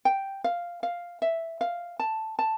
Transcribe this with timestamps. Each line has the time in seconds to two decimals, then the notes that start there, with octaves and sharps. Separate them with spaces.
0.05 G5
0.44 F5
0.83 F5
1.22 E5
1.61 F5
1.99 A5
2.39 A5